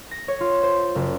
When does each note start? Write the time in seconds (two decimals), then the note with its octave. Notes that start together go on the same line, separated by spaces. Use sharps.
0.11 A#6
0.28 C#5
0.40 F4
0.63 C5
0.95 F#1